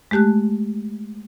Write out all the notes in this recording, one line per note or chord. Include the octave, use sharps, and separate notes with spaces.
G#3 A3 G4 A5 F#6